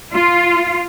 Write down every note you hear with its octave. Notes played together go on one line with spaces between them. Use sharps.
F4